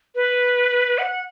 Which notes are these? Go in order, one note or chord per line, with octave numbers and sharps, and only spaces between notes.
B4
F#5